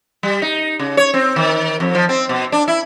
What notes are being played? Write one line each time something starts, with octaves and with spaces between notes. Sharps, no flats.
G3
D#4
C#3
C#5
C4
D#3
F2
F3
C4
B2
D4
E4